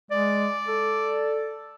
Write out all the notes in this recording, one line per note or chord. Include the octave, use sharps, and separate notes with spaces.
G#3 D5
A4